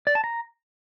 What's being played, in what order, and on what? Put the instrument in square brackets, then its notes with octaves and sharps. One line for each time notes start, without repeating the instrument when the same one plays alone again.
[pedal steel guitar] D5
A5
A#5